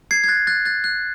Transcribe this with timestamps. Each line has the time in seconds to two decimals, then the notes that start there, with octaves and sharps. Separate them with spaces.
0.11 G#6 C7
0.24 G#6
0.28 F#6 A6
0.47 F#6 A6
0.65 F#6 A6
0.84 F#6